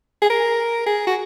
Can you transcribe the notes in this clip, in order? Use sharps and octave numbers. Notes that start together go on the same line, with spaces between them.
G#4
A#4
G#4
F#4